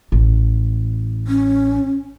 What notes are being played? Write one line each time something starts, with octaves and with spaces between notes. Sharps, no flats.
A1
C#4